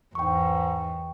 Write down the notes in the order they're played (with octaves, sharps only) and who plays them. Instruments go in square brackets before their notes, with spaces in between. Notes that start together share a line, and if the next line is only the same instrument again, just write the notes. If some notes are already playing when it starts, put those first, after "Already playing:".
[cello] E2 [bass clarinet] G#2 [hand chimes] G5 C#6